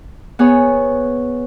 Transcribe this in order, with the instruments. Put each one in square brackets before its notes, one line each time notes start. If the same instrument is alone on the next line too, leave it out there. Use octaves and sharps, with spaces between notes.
[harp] B3 G#4 C#5